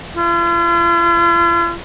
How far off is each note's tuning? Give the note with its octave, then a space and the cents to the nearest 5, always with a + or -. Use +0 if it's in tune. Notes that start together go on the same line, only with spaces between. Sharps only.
F4 -45